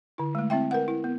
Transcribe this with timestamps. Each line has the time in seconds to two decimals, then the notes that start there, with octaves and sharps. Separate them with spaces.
0.18 D3 E4
0.35 G#3 A3
0.50 C4 E4 E5 G5
0.71 A#4 B4 F#5
0.88 E4
1.04 B3